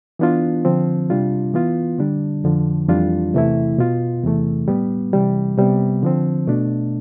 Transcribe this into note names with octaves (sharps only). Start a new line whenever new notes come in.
E3 B3 D4 F4
D3 F3 C4
C3 G3 D4 F4
E3 B3 F4
D3 G3 D4
F2 D3 F3
F2 E3 G3 D4 F4
E2 C3 E3 A3 E4
B2 B3 F4
E2 C3 E3 A3
A2 G3 B3
C3 E3 G3
C3 G3 B3
D3 F3 C4
B2 A3 D4